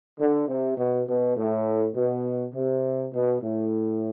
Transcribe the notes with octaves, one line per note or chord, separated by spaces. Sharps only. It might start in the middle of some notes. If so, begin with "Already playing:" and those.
D3
C3
B2
B2
A2
B2
C3
B2
A2